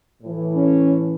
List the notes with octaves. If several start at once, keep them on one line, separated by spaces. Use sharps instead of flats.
A2 E3
C#4